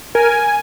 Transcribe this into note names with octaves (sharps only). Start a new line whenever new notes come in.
A#4 G#5